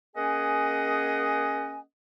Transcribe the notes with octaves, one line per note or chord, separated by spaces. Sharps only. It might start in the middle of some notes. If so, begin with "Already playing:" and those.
A#3 C#4 G#4 D#5 F#5 G#5